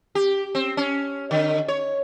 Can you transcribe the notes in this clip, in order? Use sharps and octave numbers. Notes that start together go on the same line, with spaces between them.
G4
C4
C#4
D3
C#5